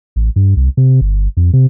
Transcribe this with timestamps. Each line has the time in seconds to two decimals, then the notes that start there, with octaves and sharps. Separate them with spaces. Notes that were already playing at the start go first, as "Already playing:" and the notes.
0.16 A1
0.36 G2
0.57 C2
0.77 C3
1.01 G1
1.37 F2
1.53 C3